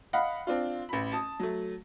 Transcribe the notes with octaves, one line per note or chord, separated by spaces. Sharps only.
D#5 F5 F#5 B5
C4 D4 F4
A1 B5
A5 D#6
F#3 A3